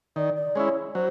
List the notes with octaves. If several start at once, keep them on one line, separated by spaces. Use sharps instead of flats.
D#3 D5
D5
G#3 C#4 E4 C#5
F#3 C5